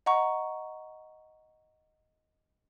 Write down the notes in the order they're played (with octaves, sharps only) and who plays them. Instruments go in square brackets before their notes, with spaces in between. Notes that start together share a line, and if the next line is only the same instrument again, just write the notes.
[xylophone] D#5 F#5 A#5 C#6